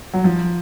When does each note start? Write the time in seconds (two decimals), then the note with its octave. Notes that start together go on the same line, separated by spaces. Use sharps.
0.13 F#3
0.24 F3